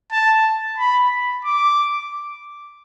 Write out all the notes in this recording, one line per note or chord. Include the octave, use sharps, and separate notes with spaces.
A5
B5
D6